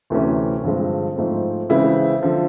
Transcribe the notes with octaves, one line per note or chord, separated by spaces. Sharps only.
D2 C3 E3 A3 C#4
G2 D3 F3 G#3 C4
G#2 F3 A3 C4
C#3 E3 G#3 C4 E4
D3 F3